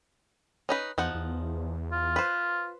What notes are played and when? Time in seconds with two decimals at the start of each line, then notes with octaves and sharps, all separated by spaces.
0.69 C#4 D#4 B4
0.98 E2 F3 D#4 F#5
1.15 E2
1.92 F4
2.16 B4 C5